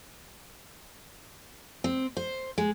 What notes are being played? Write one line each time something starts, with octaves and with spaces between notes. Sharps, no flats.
C4
C5
G#3